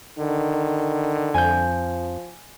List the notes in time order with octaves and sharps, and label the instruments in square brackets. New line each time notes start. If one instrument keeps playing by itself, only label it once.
[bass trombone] D3 [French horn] D#3
[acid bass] F2 [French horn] F3 [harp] G#5 G6